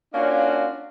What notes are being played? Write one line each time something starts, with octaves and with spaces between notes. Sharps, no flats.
A#3 C#4 D4 F4 F#4 D5